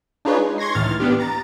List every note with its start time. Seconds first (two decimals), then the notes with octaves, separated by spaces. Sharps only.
0.25 D4 D#4 F4 G#4 B4 C#5
0.38 G#3
0.58 C6 C#6 G#6 A#6 C7
0.75 C#2 A2 D#3 E3 F6 A6
1.00 A#3 B3 D4 G4
1.20 A#5 A6